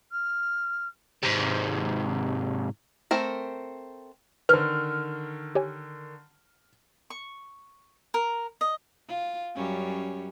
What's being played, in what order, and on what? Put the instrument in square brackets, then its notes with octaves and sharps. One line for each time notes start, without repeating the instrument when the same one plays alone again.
[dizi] F6
[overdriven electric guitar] G#2 C3
[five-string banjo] A3 C4 A#4
[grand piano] D3 D#3 [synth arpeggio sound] B4 C5 [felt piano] F6
[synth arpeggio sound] G4 C#5 G#5
[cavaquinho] C#6
A#4
D#5
[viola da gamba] F4
F#2 G3 C#4